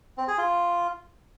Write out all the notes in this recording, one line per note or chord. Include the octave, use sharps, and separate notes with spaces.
C4
G#4
F4